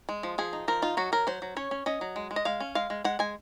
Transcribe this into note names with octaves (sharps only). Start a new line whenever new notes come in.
G#3
F3
F3 G#4
D#4
F3 A#4
D#4 F4
F#3 F#4
F#3 A#4
F#3 C5
F#3
C#4 C#5
C#4
C#4 D#5
F#3
G#3
G#3
D#5
G#3 F5
C#4
G#3 F5
G#3
G#3 F#5
G#3 G#5